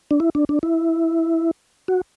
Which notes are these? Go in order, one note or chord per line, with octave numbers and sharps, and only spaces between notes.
D4
E4
D4
D4
E4
F#4